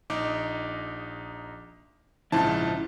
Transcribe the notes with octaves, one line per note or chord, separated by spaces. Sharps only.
A#1 D#4 D6
A#1 G#2 C#3 F3 E4 A5